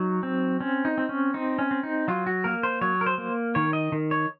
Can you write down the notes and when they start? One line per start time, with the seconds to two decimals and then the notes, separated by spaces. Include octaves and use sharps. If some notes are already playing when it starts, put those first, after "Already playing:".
Already playing: F#3 D#4
0.23 C4
0.61 C4 C#4
0.85 D#4
0.98 C4
1.09 C#4
1.34 C4 D#4
1.59 C#4
1.71 C4
1.83 D#4
2.08 F#3 F4
2.27 F#4
2.44 A#3 A#4
2.63 C5
2.81 F#3 C#5
3.01 A#4
3.06 C5
3.18 A#3
3.55 D#3 C#5
3.73 D#5
3.92 D#3
4.11 C#5